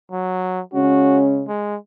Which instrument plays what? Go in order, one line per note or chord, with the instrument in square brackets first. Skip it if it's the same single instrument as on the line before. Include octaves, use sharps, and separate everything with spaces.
[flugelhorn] F#3
[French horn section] C#3 G#3 C#4 [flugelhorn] F#4
[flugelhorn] G#3